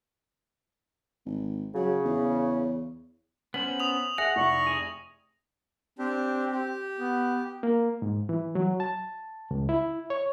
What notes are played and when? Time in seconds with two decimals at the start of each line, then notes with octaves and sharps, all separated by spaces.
1.26 G#1
1.75 C#3 F#3
2.05 E2
3.54 B3 C#4 C5 B6 F#7
3.80 D#6 F7
4.18 G#4 E5 F#5 G#5 A#6
4.36 F1 E4 D5 C#6
4.67 G#4
5.99 C4 D4 G4
6.51 G4
6.99 B3
7.63 A#3
8.02 G#2
8.29 E3
8.55 F#3
8.80 A5
9.51 C#2
9.69 E4
10.10 C#5